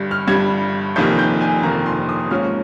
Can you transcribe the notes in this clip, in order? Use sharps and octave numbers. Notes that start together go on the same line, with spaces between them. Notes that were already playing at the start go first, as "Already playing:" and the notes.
Already playing: G1 G2 G3
F6
G1 G2 G3 G#6
F1 F2 C3 D#3 A#3 G6
G6
G#5
F1 F2 C3 D#3 A#3 A#5
C6
D#6
G#2 F3 A#3 C#4 F6